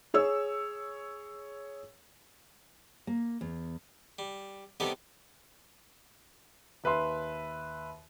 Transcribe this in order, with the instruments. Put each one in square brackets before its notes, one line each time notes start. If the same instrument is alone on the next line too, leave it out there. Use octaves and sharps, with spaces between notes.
[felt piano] G#4 C#5 E6
[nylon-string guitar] A#3
E2
[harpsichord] G3
C3 G3 B3 D#4 G4 A4
[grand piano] D#2 B4 E5 C6